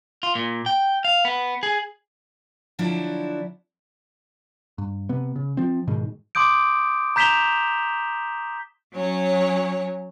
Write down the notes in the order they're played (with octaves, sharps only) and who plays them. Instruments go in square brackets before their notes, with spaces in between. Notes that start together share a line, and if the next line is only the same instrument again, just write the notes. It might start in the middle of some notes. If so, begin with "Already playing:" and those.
[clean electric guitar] F4
A#2
G5
F5
B3
G#4
[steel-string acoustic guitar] D3 F3 F#3 D4 E4
[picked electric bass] G2
C3 B3
C#3
F3 C4
G#2 B2 D#3 G#3
[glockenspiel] C6 D6 D#6 G6 D7
A#5 G6 B6 E7 F7 G7
[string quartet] F#3 C#4 C#5